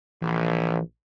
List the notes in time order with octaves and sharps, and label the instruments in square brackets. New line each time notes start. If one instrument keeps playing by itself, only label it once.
[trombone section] A#1 [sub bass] E3